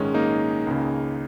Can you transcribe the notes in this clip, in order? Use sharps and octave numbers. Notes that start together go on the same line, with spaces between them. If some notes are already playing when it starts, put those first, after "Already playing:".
Already playing: A#1 G#2 D#3 G#3 C#4
A#3 D#4
C#2 C#3